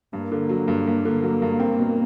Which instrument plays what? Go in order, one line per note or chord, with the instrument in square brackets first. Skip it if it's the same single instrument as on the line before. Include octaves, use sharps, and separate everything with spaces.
[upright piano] G2 [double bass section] A#3
[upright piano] D3
F#3
G2
G2
D3
F#3
G2
C4
B2